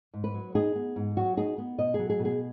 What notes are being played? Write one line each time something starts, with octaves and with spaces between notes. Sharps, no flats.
G#2
B4
F#3
D#4 G#4
B3
G#2
F#3 F#4
D#4 G#4
B3
B2 D#5
G#4
F#3
G#4
B2
G#4